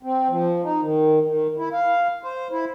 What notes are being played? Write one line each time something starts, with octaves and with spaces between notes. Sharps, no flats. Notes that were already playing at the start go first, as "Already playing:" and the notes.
C4
F3
D#4
D#3
D#3
E4
F5
C5
E4